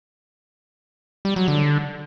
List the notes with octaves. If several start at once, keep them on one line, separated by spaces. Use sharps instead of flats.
G3
F#3
D3